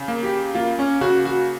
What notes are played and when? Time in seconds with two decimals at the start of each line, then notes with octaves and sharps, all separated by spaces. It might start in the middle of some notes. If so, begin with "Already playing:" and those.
Already playing: C#3
0.08 A#3
0.23 G4
0.55 A#3 F4
0.79 C#4
1.01 C#3 F#4
1.25 F#4